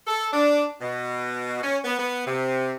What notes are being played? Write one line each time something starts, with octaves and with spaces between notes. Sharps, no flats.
A4
D4
B2
C#4
B3
B3
C3